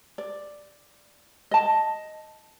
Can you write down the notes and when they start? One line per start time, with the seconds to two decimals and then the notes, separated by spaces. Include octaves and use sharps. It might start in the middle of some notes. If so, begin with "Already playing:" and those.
0.18 D5
1.51 D#5 A5